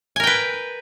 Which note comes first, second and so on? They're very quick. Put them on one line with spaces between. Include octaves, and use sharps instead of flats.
G#5 A#4 G5 B4